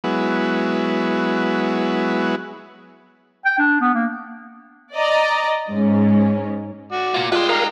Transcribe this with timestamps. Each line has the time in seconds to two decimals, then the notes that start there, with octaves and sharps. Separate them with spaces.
0.04 F#3 G#3 B3 E4
3.45 G5
3.59 D4
3.81 B3
3.94 A#3
4.94 D5 D#5 A#5
5.70 G#2 C#4
6.92 F#4 D5
7.14 A#3 F4
7.32 G3 G#3 F4 B4 G5 C6
7.49 D#4 A#4 F5 A#5